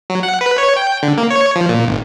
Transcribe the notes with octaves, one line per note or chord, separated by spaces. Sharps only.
F#3
F#5
B4
C#5
G5
D3
A#3
C#5
F3
A#2
G#1